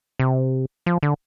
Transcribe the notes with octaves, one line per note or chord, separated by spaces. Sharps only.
C3
F3
D3